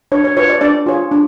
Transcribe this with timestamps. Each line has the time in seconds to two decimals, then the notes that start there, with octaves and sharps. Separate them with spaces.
0.12 D4 C#5
0.24 C#5
0.37 F4 B4 C#5
0.50 D5
0.61 D4 D5
0.86 F4 G#4 C#5
1.11 D4